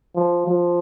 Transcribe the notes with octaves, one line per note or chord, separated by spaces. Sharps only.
F3
F3